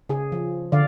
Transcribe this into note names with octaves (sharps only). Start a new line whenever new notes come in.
C#3 G#4
F3
D3 D5 F5